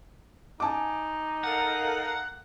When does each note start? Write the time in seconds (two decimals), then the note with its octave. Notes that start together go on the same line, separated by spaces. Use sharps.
0.60 D#4 G#5 A5 D6
1.44 A4 A#4 F5 F#5